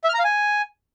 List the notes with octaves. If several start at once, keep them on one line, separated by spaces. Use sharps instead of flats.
E5
F6
A#5
F5
G#5